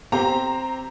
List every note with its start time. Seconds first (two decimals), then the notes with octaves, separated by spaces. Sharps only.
0.12 C4 G4 C5 A#5